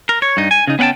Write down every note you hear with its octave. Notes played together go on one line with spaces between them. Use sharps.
A#4
C#5
G2 D#4
G#5
C#3 D#4
B3 C#4 F#5 G5 A5